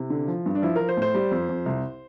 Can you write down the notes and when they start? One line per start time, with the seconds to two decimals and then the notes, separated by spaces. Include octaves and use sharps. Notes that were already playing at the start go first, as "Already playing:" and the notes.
Already playing: C3 E4
0.10 D3
0.27 F3
0.46 G2
0.55 D4
0.62 F3 E4
0.76 F3 A#4
0.89 C5
0.97 A2
1.02 C5
1.15 G3
1.31 F2
1.49 F2
1.66 C2